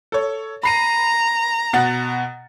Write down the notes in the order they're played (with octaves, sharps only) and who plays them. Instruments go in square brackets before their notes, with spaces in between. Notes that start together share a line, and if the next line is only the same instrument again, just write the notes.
[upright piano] A4 C#5
[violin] A#5 [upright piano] B5 C7 D#7
[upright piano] B2 F#5 A6